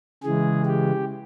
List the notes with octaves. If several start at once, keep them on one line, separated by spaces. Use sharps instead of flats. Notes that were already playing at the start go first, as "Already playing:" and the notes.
C#3 E3 G#3 G#4
G4